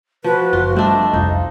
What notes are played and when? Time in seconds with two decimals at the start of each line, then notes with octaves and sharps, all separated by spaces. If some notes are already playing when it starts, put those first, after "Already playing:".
0.24 F3 F#4 B4
0.53 F#1 F4
0.76 G3 A3 C4 D4 D#5
1.14 F1 C2 D#4 F4